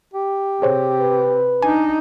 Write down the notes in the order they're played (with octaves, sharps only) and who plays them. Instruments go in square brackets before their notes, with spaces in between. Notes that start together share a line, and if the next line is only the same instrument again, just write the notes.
[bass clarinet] G4
[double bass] C3 [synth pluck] G#4 C5 C#5
[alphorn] B4
[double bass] D4 D#4 [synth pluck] G#5